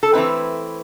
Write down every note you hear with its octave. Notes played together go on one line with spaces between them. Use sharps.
A4
E3 A3 C4 E4 B4